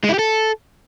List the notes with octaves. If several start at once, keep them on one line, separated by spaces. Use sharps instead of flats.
G#3
E4
G4
A4